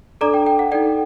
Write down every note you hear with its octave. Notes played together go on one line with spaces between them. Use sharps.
D4 A4 D5 A#5 D6
G5
G5
F#5
D#4 A4 D5 G5